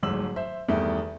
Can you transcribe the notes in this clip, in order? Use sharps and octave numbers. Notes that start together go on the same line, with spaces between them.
D1 G1 G#2 E6 F#7
C5 E5
E2 G2 D#3 A3